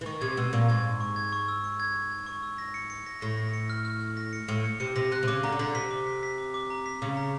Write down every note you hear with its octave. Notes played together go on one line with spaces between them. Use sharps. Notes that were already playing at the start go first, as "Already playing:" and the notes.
E3
D#3 C#6
C3 G#6
B2 E6
A#2 C#6
G#2 G#6
G#6
C#6
G#6
C#6
E6
C#6
G#6
C#6
G#6
C#6
E6
A#6
C#7
C#7
A#6
A2 A#6
A#6
C#7
F6
F6
F6
A#6
C#7
A2 C#7
C#7
C3 C#7
C3 A#6
C3 F#6
C3
C#3 D6
D3 A#5
C#3
D3 A#5
C3 B6
D6
B6
B6
D6
D6
A#5
B6
C#3 D6
A#5